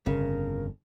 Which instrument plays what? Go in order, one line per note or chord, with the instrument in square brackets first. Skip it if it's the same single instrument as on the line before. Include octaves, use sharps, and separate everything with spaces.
[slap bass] G1 F2 [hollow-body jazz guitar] C#3 [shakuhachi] A#4